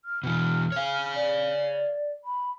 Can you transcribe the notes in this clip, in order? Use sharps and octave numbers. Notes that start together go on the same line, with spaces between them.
F6
B2 E3 F6
C#5 F5
D5
B5